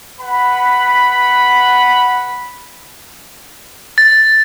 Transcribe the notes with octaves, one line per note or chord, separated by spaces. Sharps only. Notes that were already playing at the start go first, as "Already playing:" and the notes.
B4 F#5 B5
A6